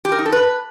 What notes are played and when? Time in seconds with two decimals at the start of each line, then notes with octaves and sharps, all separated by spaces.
0.05 G4
0.12 A#4
0.19 D#4
0.26 A4
0.32 B4